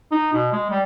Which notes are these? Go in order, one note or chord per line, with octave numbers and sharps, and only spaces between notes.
D#4
B2
G#3
G3